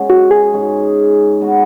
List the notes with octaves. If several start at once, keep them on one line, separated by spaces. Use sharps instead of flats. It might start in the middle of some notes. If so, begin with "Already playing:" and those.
Already playing: B2 G#3 C#4
F#4
G#4
G#2 G#3 C#4
B2 G#3 B3 F#4